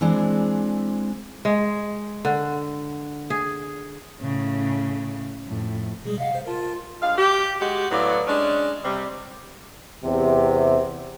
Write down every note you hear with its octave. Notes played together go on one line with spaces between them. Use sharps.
E3 G#3 C4 D4
G#3
D3
G#4
A2 C#3
F2 A2
B2 G3 G#3 G#4
C3 D#5 F5 F#5
C3 C5
F4 A#4 A5
G2 G#3 F5
G4
G#3 F#4 G4
A2 F#3 B3 D5 F5
G#3 C#4 D4
C3 G3
E2 C3